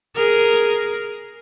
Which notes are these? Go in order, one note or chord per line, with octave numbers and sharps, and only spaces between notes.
G#4 A#4